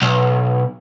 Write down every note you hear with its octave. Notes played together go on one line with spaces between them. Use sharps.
B1